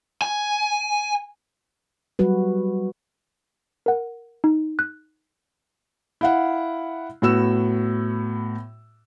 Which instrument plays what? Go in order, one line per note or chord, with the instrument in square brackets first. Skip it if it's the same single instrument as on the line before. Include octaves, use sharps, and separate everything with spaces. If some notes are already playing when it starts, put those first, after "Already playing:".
[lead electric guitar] G#5
[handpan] F#3 G3 F#4 B4
[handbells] A#4 F#5
D#4
F#6
[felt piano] E4 F5 F#5
A2 B3 F#4 E6 E7